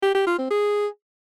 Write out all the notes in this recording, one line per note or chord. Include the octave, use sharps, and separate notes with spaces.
G4
G4
F4
C4
G#4